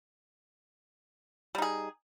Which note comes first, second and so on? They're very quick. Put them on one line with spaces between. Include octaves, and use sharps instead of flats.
G3 D#4 G#4